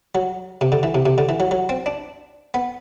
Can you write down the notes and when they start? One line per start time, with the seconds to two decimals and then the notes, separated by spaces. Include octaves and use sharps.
0.15 F#3
0.61 C3
0.72 D3
0.83 E3
0.95 C3
1.06 C3
1.18 D3
1.29 E3
1.40 F#3
1.51 F#3
1.69 C4
1.86 D4
2.54 B3